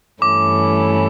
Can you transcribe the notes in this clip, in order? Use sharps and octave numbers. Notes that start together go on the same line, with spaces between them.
G2 E3 A3 C#4 E4 D6